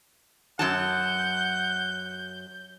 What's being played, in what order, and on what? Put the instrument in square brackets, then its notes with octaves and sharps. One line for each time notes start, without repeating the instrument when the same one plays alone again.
[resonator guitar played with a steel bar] F#2 F#3 A5 [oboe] F#5 [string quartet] G6